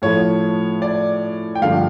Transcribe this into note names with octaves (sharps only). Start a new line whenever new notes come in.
A2 F3 A3 C#5
D5
G5
G2 D3 F3 A3 F5